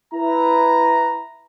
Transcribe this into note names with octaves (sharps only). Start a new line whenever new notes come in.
E4 B4 A#5